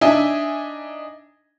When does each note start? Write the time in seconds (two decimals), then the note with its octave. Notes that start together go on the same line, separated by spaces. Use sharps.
0.01 D4 D#4 E5 G#5